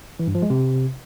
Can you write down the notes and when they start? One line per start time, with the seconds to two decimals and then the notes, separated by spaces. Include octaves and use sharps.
0.19 E3
0.27 G2
0.35 F3
0.42 G#3
0.50 C3